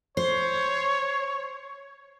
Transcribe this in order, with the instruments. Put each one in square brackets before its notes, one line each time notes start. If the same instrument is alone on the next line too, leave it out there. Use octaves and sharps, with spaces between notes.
[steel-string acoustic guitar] C5 [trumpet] C#5